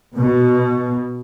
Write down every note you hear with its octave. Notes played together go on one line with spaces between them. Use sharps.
B2